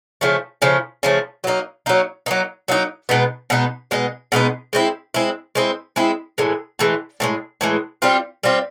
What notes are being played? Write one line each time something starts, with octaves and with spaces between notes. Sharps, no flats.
C#3 F3 A3
C#3 F3 A3
C#3 F3 A3
F#3 A#3 D#4
F#3 A#3 D#4
F#3 A#3 D#4
F#3 A#3 D#4
B2 G#3 B3 D#4
B2 G#3 B3 D#4
B2 G#3 B3 D#4
B2 G#3 B3 D#4
G#3 C4 E4
G#3 C4 E4
G#3 C4 E4
G#3 C4 E4
A2 E3 G#3
A2 E3 G#3
A2 E3 G#3
A2 E3 G#3
G3 C4 F4
G3 C4 F4